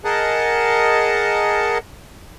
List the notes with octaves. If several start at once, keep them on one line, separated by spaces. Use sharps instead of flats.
G#4 A#4 D#5 F#5 A5